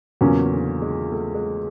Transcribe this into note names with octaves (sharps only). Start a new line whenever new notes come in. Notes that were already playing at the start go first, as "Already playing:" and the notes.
E2 A#2 C#3 F#3 A#3 C#4
D3
G#3
A3
G#3